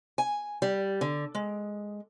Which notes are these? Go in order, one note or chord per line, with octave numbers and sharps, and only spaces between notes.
G#5
G3
D3
G#3